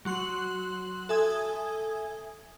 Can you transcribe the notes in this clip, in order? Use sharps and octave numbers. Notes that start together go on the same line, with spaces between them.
F#3 F#4 C6 F#6 F#7
A4 E5 G#5 D#6 G#6